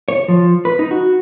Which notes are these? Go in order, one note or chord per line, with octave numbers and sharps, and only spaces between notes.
C#5
F3
B4
D#4
F#4